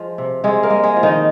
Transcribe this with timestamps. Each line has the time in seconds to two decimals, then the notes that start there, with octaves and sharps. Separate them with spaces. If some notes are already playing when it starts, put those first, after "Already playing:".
Already playing: F3 G#3 F4
0.18 C3
0.44 C3 G#3 G#4
0.63 A#3 A#4
0.70 G#3
0.83 G#3 G#4
0.96 F3
1.03 D#3 D#4